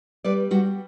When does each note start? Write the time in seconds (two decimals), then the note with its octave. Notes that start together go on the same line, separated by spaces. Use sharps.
0.24 G3 B4 D5
0.51 G3 F#4